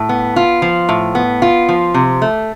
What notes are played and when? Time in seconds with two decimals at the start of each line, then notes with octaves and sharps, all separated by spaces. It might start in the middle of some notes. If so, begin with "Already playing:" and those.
Already playing: A2
0.09 B3
0.36 F4
0.62 F3
0.89 A2
1.15 B3
1.42 F4
1.69 F3
1.94 C3
2.22 A3